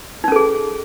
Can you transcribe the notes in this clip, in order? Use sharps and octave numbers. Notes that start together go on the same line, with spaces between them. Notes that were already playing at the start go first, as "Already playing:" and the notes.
C#4 D#4 G#4 A4